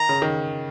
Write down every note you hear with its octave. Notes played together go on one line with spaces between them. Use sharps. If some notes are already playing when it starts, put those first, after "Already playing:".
Already playing: D#3 A#5
C#3
D#3